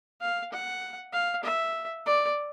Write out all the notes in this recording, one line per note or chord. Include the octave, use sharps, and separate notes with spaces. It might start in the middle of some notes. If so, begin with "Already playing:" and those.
F5
F#5
F5
E5
D5